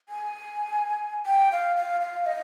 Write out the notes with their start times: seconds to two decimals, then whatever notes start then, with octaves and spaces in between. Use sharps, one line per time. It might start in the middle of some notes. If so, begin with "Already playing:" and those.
0.09 G#5
1.26 G5
1.52 F5
1.76 F5
2.01 F5
2.26 D#5